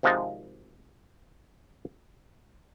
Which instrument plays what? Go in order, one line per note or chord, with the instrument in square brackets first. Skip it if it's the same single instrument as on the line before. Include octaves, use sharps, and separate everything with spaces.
[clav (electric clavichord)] G#1 C3 F3 G#3 D#4 A5